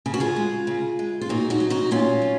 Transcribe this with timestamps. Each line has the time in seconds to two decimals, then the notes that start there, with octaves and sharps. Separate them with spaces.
0.06 C#3 G#4
0.14 F#4
0.20 F4 G#4
0.36 G#3
0.67 C#3
0.99 G#3
1.21 F4
1.29 A#2 D#4 F#4
1.50 D#4 F#4
1.60 F#3
1.70 D#4 F#4
1.91 A#2 C#4 F4
2.22 F#3